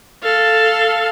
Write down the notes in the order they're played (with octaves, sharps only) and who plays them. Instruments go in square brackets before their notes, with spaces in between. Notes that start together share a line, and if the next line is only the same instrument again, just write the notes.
[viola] A4 F5